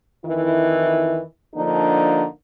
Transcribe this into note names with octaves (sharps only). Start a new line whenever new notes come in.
F2 D#3 E3 E4
D3 F3 A#3 D4 D#4